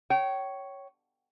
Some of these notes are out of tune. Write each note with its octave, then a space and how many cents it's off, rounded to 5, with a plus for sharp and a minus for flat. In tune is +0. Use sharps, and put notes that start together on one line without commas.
C#5 +0 G5 -30